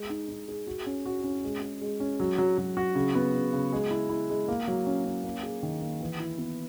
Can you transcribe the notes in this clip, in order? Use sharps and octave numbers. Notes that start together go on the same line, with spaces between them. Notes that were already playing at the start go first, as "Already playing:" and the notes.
Already playing: G#3
D#4
D#4
G#4
F#4
C#4
F#4
C#4
G#3
G#4
G#3
C#4
F#3
F#3
F#3
F#4
C#3
B3
C#3
C#3
G#3
E4
E4
G#3
A#3
F#3
C#4
C#4
A#3
G#4
D#3
A#3
E3
E4
B3